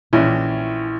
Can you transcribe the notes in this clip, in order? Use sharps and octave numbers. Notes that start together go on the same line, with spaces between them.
A#1 E3 C#4 E4